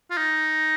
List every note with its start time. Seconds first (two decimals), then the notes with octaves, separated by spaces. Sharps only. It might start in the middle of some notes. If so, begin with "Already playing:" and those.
0.11 F4
0.17 D#4